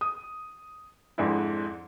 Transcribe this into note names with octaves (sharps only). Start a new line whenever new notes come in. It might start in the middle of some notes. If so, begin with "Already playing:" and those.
D#6
F2 G#2 D4 E4